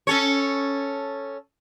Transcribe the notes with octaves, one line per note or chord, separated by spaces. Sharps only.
C#4 A4 C#5